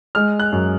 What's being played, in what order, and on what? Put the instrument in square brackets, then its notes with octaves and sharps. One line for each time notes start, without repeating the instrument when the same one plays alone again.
[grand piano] G#3 F6
F#6
F#2